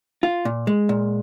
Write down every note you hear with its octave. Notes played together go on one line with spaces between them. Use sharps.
F4
A#2
G#3
A#2